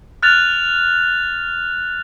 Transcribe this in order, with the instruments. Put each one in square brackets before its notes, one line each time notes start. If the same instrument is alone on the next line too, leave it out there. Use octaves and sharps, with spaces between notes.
[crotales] F6 F#6 A6 F7